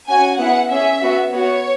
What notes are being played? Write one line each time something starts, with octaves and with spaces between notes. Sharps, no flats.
C#4 F#4 G#5
B3 E4 G#4 F#5
C#4 G#4 E5
B3 F#4
B3 F#4 C#5